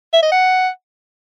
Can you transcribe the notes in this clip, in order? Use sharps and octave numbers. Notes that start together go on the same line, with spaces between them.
E5
D#5
F#5